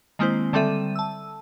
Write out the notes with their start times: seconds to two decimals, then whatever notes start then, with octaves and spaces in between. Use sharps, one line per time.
0.19 D#3 G#3 A#3 C4 E4 C5
0.53 D3 G3 C4 A4 E5 D#7
0.96 A5 E6